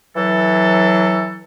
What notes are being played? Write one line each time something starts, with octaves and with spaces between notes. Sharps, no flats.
E3 F#3 A4